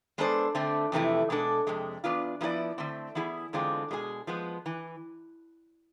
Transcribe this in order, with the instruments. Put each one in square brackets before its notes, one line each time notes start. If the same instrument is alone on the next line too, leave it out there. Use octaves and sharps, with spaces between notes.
[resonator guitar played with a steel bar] G#3 B3 D4 A4 C5
D3 A3 C4
F2 C3 E3 A3 E4
B2 G#3 D4 A4
F2 C3 G#3
E2 B2 B3 D4 F4
F3 B3 E4 A4 D5
D3 A3 C4
E3 B3 E4 G#4
E2 D3 G#3 C4 F4
B2 G#3 D4 G#4
F3 G#3 B3
E3